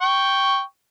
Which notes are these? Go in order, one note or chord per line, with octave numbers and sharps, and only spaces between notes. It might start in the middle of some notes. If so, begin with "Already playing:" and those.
G5 C#6